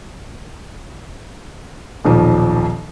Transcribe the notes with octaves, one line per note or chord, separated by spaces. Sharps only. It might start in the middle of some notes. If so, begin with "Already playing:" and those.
D#1 B1 F3